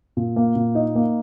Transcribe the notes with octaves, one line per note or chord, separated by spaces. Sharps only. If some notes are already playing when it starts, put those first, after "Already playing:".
A#2
A#3
A#2
D#4
A#3